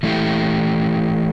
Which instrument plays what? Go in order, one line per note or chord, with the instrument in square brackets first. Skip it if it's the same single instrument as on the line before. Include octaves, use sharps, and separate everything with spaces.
[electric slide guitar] E3 A3 E4 G4